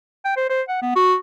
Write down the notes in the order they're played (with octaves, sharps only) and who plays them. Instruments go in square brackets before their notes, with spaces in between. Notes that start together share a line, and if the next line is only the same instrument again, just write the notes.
[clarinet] G5
C5
C5
F#5
B3
F#4